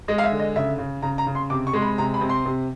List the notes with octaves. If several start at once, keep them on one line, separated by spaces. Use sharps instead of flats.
G#3 D#5
F5
E5
D3
D#5
C#3 E5
C#3
C#3 A#5
A#5
C#3
C6
C3 D6
C#6
G#3 C6
B5
C3 A#5
B5
C3
C6
C3